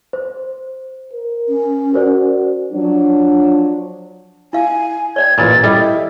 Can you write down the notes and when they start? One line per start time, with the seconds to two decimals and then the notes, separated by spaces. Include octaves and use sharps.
0.13 C5
1.13 A#4
1.49 C#4
1.94 F#4 A#4 C5 D5
2.72 F3 F#3 D4
4.53 E4 F5 G#5
5.16 C#5 D5 G5 G#6
5.38 A1 A#2 B5 A6
5.64 G3 E4 A4 D#5 D#6